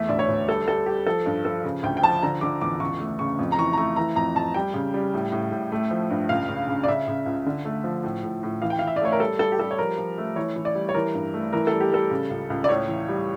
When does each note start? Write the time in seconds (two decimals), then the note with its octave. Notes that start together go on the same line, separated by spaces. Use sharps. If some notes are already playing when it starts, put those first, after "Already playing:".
Already playing: E2 A3 E5
0.09 D2 D5
0.19 C#5
0.29 D2
0.48 G3 A4
0.67 G3 A4
0.86 G3 G4
1.06 F3 A4
1.26 G2
1.45 F3 A4
1.64 C#3
1.83 D2 G5
1.97 G5
2.02 F3 A5
2.23 D3 A#5
2.41 D3 D6
2.61 E2 D6
2.80 C#2 C#6
3.00 A3
3.19 C#3 C#6
3.39 F2
3.52 A#5
3.58 E3 C#6
3.73 A#5
3.77 A3 C#6
3.96 E3 A#5
4.16 F2 A#5
4.35 F2 A5
4.54 G3 G5
4.74 C#3
4.94 G3
5.14 A2
5.32 A2
5.52 A2
5.72 A3
5.91 F3
6.10 G2
6.29 C#2 F5
6.48 C#3
6.68 C#3
6.84 D5
6.88 C#3 E5
7.08 C#3
7.26 C#2
7.46 D3
7.65 A3
7.84 F3
8.03 A2
8.23 A2
8.43 A2
8.62 E3 F5
8.70 G5
8.79 E3 F5
8.87 E5
8.96 D5
9.01 A3 C#5
9.12 A#4
9.20 G3 A4
9.39 G3 A4
9.52 G4
9.59 G3 A4
9.71 C#5
9.78 F3 A#4
9.98 F3
10.18 A3
10.36 E3 C#5
10.56 E3
10.65 D5
10.75 G3
10.89 C#5
10.94 E3 A#4
11.14 G2
11.34 A3
11.53 E3 A#4
11.67 A4
11.72 G3
11.80 G4
11.92 G3 A4
12.11 C#3
12.30 C#2
12.50 C#2
12.64 D5
12.69 A2 C#5
12.88 E3
13.09 G3